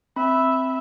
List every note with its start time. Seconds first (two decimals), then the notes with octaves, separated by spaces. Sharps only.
0.16 C4 E5 B5